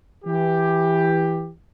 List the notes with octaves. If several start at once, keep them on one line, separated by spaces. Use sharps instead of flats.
E3 G4